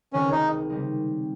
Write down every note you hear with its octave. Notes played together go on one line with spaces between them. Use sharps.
C#2 C3 D#3 C#4
D#4
C#3 G3 C4 D#4